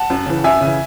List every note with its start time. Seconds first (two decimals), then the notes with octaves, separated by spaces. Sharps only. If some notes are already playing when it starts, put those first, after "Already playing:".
Already playing: F#5 A5
0.10 F#2
0.26 C#3 E3
0.44 F#2 E5 G#5
0.61 C#3 E3